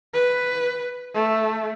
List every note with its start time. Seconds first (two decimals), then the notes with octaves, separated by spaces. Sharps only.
0.14 B4
1.14 A3